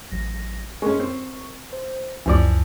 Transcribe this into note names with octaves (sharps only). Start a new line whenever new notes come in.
A1 F#3 A#6
G#3 C#4 A#4 C#6
C4
C5
C#2 F#2 E3 F3 D5